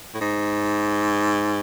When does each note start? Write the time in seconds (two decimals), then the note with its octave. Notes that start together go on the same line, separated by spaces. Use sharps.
0.14 A2
0.21 G#2